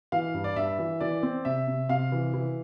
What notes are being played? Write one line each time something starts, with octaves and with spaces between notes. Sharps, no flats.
E3 F5
G2
D5
G2 E5
E3
E3 D5
C4
C3 E5
C3
C3 F5
E3
E3